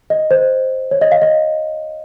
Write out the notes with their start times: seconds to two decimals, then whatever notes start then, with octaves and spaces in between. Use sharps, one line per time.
0.10 D#5
0.31 C5
0.91 C#5
1.01 D#5
1.12 F5
1.22 D#5